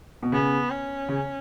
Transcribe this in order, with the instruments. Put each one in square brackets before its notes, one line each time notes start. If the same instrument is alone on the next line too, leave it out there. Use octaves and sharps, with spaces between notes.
[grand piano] B2
[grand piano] C#3 [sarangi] B3
[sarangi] C#4
[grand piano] C#3